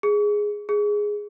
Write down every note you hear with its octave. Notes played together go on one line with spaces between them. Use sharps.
G#4
G#4